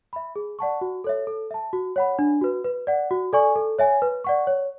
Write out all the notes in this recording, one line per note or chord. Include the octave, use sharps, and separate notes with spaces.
E5 B5
G#4
D5 F#5 A5 C#6
F#4
A4 C#5 E5
A4
E5 A5
F#4
C#5 F#5 B5
D4
F#4 B4
B4
D5 F#5
F#4
A4 D5 G#5 C#6
A4
C#5 E5 G#5
B4
D5 F#5 C#6
C#5